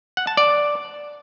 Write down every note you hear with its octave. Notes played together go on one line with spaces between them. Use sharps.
F#5
A5
D5